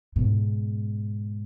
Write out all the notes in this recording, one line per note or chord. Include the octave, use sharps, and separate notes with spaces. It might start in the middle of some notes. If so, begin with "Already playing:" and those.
G#2 B2